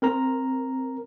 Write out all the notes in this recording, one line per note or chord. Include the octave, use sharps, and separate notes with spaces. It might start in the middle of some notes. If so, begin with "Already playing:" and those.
C4 A#4 A#5